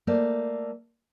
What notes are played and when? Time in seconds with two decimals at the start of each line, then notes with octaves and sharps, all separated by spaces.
0.07 A3 A#3 C5 D5